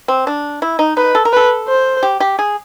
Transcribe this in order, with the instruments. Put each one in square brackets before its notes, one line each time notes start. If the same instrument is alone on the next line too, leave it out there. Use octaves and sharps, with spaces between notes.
[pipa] C4
D4
E4
D#4
[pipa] D#4 [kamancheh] B4
[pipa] A4
A#4
[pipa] A4 [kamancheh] B4
[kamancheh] C5
[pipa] G4
G4
G#4